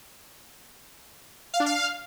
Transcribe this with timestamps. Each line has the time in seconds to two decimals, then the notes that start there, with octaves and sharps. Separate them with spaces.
1.54 F5
1.60 D4
1.66 F5